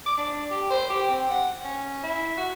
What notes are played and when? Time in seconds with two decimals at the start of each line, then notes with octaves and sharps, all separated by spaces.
0.06 D6
0.18 D4
0.51 G4
0.70 C5
0.90 G4
1.09 C4
1.30 F#5
1.64 C#4
2.03 E4
2.37 F#4